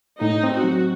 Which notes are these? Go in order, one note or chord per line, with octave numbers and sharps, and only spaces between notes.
A2 D#4
C4
F#4
F#3